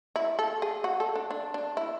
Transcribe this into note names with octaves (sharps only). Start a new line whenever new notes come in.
E4
A4
G#4
F#4
A4
D4
D4
D4
E4